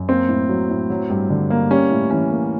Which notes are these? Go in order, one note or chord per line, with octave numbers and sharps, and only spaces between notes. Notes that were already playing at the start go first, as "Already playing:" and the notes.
Already playing: F#2
A#3 C4
A2
F#3
A2
F#3
G2
D3
A#3
G3 C#4
A2
E3 C#4
A#3